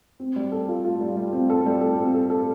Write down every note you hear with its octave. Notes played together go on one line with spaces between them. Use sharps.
C4
G3
A4
F4
F4
G3
G3
C4
A4
G3
A4
C4
A4
A4